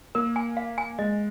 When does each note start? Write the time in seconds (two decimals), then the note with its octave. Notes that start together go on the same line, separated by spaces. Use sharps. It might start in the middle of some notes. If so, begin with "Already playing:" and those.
0.15 A#3 A#4
0.36 G#5
0.57 F5
0.78 G#5
0.99 G#3 D#5